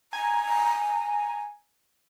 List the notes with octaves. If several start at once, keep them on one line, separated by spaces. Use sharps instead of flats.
G#5 A#5